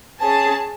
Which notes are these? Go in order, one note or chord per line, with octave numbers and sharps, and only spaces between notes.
C#4 G#4 A5